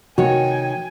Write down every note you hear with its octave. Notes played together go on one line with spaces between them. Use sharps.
C3 D#3 F3 A#3 F#4 C#5 G5 G#5